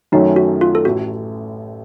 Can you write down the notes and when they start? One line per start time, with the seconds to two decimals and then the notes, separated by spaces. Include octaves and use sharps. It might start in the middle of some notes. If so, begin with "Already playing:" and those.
0.12 F#2 D#3 F#3 A3 C#4 D#4
0.36 F#4
0.61 F4
0.75 A4
0.85 A1 A2 A3 F#4